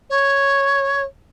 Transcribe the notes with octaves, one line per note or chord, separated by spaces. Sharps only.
C#5